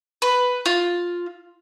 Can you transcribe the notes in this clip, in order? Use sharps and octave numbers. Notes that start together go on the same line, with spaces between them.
B4
F4